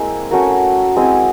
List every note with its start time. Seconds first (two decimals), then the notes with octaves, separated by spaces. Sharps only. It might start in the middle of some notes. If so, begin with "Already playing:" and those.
Already playing: G#3 A#3 C4 E4
0.31 A3 C#4 F#4 A#4
0.96 G#3 C4 E4 G#4